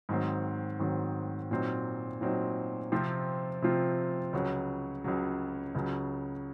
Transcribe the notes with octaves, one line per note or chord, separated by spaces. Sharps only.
G#2 D#3 F#3 C4
G#2 D#3 F#3 C4
A#2 F#3 C4 D#4
A#2 F#3 C4 D#4
C3 F3 C4 F4
C3 F3 C4 F4
C#2 C#3 F#3
C#2 C#3 F#3
C#2 C#3 F#3